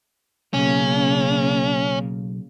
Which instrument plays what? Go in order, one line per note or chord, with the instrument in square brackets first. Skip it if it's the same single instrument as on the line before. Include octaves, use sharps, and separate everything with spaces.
[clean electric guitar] B1 [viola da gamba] C#3 A#3 [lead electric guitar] C#4